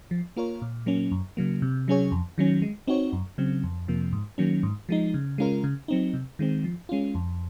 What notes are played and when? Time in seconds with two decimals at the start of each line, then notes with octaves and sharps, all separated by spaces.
0.11 F3
0.37 A#3 F4 A#4 C#5
0.62 A#2
0.86 F#3 A#3 C#4
1.12 F#2
1.37 C#3 F#3 A#3
1.62 C3
1.88 F#3 C#4 G#4 C#5
2.12 F2
2.38 D#3 F#3 C#4
2.62 G#3
2.87 C4 D#4 F#4 C#5
3.13 F#2
3.38 C#3 F#3 C4
3.63 F2
3.88 C3 F3 A#3
4.13 G#2
4.38 D#3 F#3 A#3 C#4
4.63 G#2
4.89 F3 G#3 D#4
5.14 C#3
5.38 G#3 C#4 F4 A#4
5.64 C#3
5.88 F#3 C4 D#4
6.14 C3
6.39 D#3 G#3 C4
6.64 F3
6.89 G#3 C#4 F4
7.15 F2